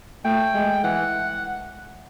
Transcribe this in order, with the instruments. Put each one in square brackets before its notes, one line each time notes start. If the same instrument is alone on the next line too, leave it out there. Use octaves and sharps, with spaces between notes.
[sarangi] A3 [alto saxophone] G5
[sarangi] G#3
[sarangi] E3 [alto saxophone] F#5